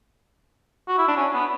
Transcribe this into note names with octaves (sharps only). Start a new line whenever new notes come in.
F#4
E4
D4
C#4
B3